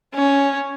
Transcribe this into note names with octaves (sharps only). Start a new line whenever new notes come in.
C#4